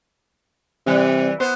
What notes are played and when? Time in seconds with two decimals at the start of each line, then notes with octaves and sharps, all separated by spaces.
0.87 C3 E3 G3
1.40 B3 C5